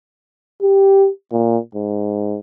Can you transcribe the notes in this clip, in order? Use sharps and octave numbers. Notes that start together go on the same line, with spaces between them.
G4
A#2
G#2